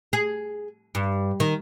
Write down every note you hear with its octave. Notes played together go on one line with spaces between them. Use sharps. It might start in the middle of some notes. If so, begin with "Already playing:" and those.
G#4
G2
D#3